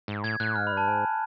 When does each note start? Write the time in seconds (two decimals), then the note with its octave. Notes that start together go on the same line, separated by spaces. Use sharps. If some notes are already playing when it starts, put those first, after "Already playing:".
0.08 G#2
0.24 A2 G#6
0.40 A2 F#6
0.56 G#2 F6
0.67 B5
0.72 G2
0.77 A5
0.88 G#2 G#5